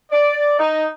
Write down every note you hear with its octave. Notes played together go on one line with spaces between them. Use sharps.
D5
D#4